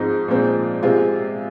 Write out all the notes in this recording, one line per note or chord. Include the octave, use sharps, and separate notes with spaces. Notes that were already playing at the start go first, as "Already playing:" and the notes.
Already playing: G#2 F3 C4 D#4
A#2 F3 G#3 C4
C3 G#3 C4 F4